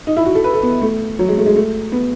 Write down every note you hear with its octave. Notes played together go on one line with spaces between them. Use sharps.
D#4
E4
F#4
A4
B4
A4
B3
A3
F#3
G#3
A3
G#3
A3
B3